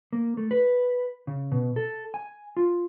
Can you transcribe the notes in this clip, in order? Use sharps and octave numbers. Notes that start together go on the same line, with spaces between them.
A#3
A3
B4
C#3
B2
A4
G#5
F4